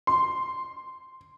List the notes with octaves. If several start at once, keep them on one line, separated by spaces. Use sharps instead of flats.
C6